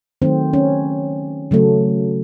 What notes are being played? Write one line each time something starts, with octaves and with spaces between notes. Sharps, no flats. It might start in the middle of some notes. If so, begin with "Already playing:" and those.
D#3 F#3 A3 C4
C#4
C#3 F#3 A3